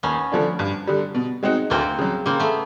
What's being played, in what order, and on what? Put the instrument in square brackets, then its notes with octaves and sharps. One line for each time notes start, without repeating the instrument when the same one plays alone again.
[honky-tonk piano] D#2 [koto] B3 C#4
[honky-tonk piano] D3 F3 A3 D4
G2
D3 G3
B2
G#3 C4 D#4 F#4
[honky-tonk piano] D2 [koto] A#3 C4
[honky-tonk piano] C#3 F#3
[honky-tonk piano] C#3 [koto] A#3 C4
[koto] A3 B3